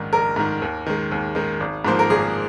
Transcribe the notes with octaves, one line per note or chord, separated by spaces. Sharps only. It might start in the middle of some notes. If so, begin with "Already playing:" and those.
Already playing: A#1 G#2 D#3
A#1 A#4
G#2 D#3
D#2
D#3 G#3
D#2
D#3 G#3
G#1
G#2 F3 A#3 C5
A#4
G#1 G#4